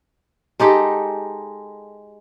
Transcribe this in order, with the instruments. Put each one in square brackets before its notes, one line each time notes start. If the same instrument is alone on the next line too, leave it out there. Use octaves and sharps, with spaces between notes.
[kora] G#3 D#4 G4 A4